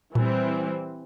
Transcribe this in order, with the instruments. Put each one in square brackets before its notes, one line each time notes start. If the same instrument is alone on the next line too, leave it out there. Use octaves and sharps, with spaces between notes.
[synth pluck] A#2 [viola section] E3 G3 C4